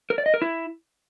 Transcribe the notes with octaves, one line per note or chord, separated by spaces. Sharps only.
A#4
D5
D#5
A#4
E4